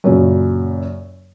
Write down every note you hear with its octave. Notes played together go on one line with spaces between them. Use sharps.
F#2 A#2 C#3 F#3